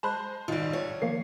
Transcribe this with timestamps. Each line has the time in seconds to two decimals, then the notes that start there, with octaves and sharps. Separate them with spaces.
0.03 G#3 C5 A5 B5 F#6
0.48 B1 D#3 F4 D5
0.73 C#5
1.02 D#3 F3 A#3 C7